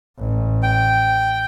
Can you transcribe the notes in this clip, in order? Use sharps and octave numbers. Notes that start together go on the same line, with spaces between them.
A1
G5